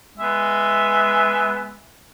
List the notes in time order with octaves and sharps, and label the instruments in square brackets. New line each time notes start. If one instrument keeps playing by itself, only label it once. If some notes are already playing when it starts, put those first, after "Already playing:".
[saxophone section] G#3 B3 E5